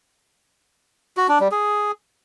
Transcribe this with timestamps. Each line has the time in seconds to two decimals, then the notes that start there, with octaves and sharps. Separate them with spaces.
1.17 F#4
1.29 D4
1.40 G3
1.52 G#4